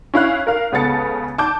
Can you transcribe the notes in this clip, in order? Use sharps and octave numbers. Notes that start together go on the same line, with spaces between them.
C#4 E4 F5 F#6
A#4 F5
C#2 C#3 B3 A4 A6 C#7
A5 D6 G6